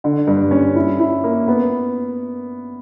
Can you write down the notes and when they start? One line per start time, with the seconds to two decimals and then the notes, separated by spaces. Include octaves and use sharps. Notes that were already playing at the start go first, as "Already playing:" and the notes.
0.04 D3
0.27 G2
0.51 C#4
0.75 E4
0.99 E4
1.24 A#3
1.48 B3